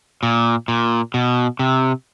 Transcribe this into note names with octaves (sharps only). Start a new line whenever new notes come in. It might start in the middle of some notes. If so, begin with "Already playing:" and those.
A#2
A#2
B2
C3